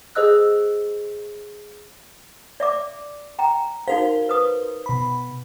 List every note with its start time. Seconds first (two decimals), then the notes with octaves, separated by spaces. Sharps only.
0.15 G#4 C5 D#5 E6 F#6
2.60 D5 E5 D6
3.39 G5 A#5
3.88 D#4 F#4 A#4 C5 F5
4.29 B4 D#6
4.86 B2 B5